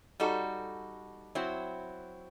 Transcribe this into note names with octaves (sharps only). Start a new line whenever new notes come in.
G3 D#4 F#4 A4
F#3 C4 E4